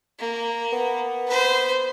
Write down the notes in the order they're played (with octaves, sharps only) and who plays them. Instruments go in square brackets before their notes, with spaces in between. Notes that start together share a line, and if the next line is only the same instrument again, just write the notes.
[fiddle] A#3
[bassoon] B3
[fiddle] B4 C5